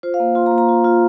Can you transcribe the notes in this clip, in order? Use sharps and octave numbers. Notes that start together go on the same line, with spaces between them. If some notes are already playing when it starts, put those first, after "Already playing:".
F4 C5
F5
A#3
F4 C6
A#5
A#3
A#5
F4
F4